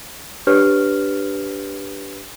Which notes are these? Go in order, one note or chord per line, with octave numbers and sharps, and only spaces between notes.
D4 G4 B4 C#5 F6